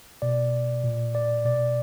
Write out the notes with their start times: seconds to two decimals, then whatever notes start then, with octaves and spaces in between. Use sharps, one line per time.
0.22 B2 D5
0.84 A#2
1.15 D5
1.45 B2 D5